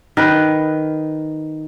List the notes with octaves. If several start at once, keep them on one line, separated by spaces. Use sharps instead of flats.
D#3 B4